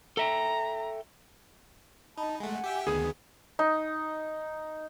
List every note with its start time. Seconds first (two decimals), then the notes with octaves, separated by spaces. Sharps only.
0.17 A4 E5 G5 A#5
2.17 D#4 D#5 A5 B5
2.40 G#3 A3 F#5 G#5
2.64 G4 E5 G5
2.87 D2 D#3 B3 G#4 D#6
3.59 D#4